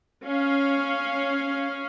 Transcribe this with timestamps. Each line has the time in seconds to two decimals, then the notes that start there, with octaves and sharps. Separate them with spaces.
0.24 C#4 F5